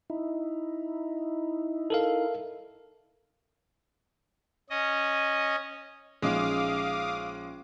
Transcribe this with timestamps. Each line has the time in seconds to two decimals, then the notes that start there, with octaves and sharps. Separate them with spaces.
0.10 D#4 E4
1.90 A4 A#4 F5
4.70 C#4 D#5
6.22 A#1 G#3 C#4 D#4 F5 D6 D#6